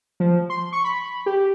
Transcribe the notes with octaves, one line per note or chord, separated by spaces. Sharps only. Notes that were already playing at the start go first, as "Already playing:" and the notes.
F3
C6
C#6
B5
G4